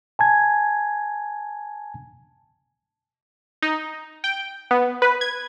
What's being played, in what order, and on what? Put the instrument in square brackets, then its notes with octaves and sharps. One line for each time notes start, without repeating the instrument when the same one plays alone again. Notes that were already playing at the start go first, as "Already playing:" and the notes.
[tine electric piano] G#5 A5 G#6
[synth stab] D#4
G5
B3
B4
G#6